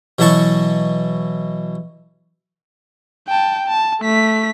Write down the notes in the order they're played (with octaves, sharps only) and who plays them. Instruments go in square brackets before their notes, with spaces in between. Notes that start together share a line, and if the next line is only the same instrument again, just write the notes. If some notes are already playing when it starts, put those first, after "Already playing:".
[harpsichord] B2 E3 F#3 E4 A5 C#6
[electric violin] G5 A5
A5
A3 B6